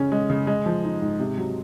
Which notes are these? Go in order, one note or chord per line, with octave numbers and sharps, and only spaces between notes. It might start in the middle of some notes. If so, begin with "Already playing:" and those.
Already playing: C#3 C#4
G#3
C#3
G#3
F3
D#4
G#2
C3
F#3